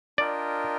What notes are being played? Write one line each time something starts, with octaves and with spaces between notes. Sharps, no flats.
D4 F4 A#4 D5 D#5 G5